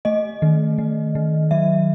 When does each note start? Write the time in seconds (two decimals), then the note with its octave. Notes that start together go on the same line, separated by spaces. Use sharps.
0.05 A3 D#5
0.42 D#3
0.78 D#3
1.15 D#3
1.51 F#3 E5